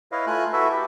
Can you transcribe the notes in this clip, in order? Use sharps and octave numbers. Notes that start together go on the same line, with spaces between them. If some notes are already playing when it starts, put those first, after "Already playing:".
E4 B4 C#5 D#5 F5
A3 F4 G#5 F#6
E4 F#4 A4 B4 E5
G4